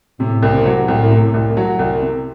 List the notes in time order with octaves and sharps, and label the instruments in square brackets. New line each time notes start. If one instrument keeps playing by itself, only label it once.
[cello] A2 [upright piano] C3
[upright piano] C2
[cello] C3
[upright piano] F#3
[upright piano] C2 [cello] A2
[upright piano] C3
C2
F#3
C2
C3